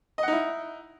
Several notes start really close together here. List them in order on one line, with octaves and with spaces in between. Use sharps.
D#5 F#5 D#4 E4